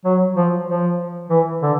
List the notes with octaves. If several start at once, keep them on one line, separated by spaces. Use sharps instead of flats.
F#3
F3
F3
E3
D3